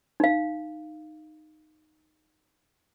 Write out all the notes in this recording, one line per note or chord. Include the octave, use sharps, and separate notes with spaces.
D#4 F5